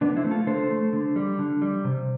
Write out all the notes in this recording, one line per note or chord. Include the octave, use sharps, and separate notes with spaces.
D3 B3 D4
C4 E4
A3
F4 A4
D3 A4 C5
A3
D3
G3
D3
G3
C3